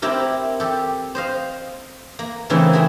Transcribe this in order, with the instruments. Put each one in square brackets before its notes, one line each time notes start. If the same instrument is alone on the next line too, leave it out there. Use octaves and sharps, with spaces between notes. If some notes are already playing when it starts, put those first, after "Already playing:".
[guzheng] C4 E4 G4 A#4
G4 A4
C5 D#5 F5
A#3
C#3 E3 A3 C4 D#4 E4
C4 E4 F#4 G#4